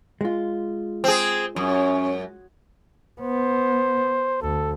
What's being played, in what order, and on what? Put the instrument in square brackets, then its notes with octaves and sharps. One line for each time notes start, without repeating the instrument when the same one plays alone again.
[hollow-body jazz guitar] G#3 F4
[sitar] C4 G#4
[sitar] F#2 [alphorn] C#4
[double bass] B3 [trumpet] C5
[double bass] D2 [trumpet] A4